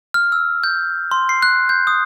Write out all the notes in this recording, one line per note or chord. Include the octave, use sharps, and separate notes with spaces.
F6
E6
G6
C6
C7
F#6
G6
D#6